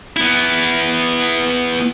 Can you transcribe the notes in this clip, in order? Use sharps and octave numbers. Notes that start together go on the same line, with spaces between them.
B3 E4